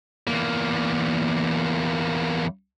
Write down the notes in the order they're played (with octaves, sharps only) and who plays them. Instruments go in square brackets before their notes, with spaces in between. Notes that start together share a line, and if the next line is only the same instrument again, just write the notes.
[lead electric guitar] E2 A#3